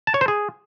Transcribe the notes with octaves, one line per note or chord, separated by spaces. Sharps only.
A5
C#5
C5
G#4